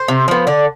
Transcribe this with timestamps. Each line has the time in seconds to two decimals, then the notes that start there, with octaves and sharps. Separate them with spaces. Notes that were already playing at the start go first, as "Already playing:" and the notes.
Already playing: C5
0.08 C3
0.28 F3 B3
0.47 D3 D5